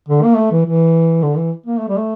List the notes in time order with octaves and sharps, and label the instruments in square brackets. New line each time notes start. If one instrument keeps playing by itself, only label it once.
[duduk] D3
A#3
A3
E3
E3
D3
E3
A#3
A3
G3
A3